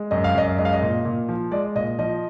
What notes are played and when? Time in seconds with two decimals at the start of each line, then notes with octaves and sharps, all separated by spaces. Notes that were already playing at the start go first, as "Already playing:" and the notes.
Already playing: G#3
0.11 F#2 D#5
0.24 F5
0.35 F#2 D#5
0.58 G#3 D#5
0.65 F5
0.73 D#5
0.82 A#2
1.05 A#2
1.29 F3
1.51 G#3 D5
1.75 A#2 D#5
1.99 F3 D#5